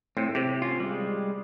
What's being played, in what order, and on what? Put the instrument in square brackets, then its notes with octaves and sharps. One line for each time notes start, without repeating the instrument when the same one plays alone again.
[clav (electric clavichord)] A2 [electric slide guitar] C4
[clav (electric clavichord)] C3 [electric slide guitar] G4
[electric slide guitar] C#4 F4
G3 G#3